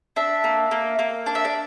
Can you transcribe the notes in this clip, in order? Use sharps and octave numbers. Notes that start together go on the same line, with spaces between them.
D4 E5
A#3
A#3
A#3
D4 D5
E5
D5